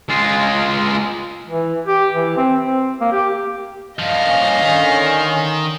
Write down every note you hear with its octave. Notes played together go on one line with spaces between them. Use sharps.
G#3 F4
E3
G4
E3
C4
C4
A#3
G4
G2 F3 D#5 F5
A#3 C#4
D3 D#3 C#4